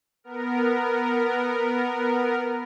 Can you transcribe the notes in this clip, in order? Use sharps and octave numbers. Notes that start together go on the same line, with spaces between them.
B3 A#4